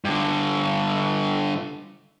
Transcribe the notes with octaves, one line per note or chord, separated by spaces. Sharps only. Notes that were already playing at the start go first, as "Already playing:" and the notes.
G2 D3